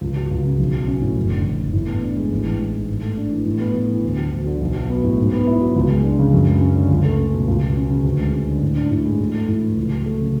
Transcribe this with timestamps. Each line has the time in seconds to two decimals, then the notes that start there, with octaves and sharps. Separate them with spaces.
0.01 C#2
0.16 F#3
0.31 C#2
0.45 C#3
0.60 B1
0.73 F#3
0.88 C#4
1.02 A2
1.17 F#1
1.30 D3
1.44 F#1
1.60 E2
1.73 A2
1.88 B3
2.03 D4
2.17 G#3
2.31 A1
2.46 E3
2.60 G#3
2.74 G#2
2.88 A2
3.03 A3
3.18 D4
3.31 E3
3.46 A2
3.60 B3
3.74 A2
3.89 E3
4.04 D2
4.18 F#3
4.31 D2
4.46 D3
4.61 B1
4.74 F#3
4.90 B3
5.04 A2
5.18 G#2
5.33 B3
5.47 E4
5.62 F#3
5.76 C#2
5.89 G#3
6.04 D4
6.19 C#3
6.33 F#2
6.47 G#3
6.61 C#4
6.76 D3
6.91 C#2
7.05 A3
7.18 C#4
7.34 B2
7.48 C#2
7.62 F#3
7.77 C#4
7.90 C#3
8.04 D2
8.19 G#3
8.34 C#4
8.48 D3
8.62 A2
8.76 D4
8.91 A2
9.05 G#3
9.20 A2
9.34 A3
9.48 A2
9.62 E3
9.77 C#2
9.91 F#3
10.06 A3
10.21 C#3